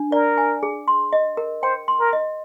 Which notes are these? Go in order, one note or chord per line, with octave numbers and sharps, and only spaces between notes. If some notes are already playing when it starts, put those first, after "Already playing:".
Already playing: D4
A#4 D5
G#5
G#4
C6
D#5
A#4
C5 G5
C6
A#4
D#5